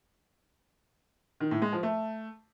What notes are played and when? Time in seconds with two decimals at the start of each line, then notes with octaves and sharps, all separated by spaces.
1.40 D#3
1.51 A2
1.62 G#3
1.72 F3
1.83 A3